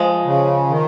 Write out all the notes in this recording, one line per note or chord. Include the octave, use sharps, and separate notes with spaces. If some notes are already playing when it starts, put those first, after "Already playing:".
Already playing: F3 G#3
C#3
D#3